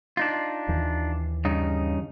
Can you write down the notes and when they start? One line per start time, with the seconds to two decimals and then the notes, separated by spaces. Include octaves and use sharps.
0.17 D4 D#4 F4
0.68 D#2 E3
1.45 G2 C#3 D#4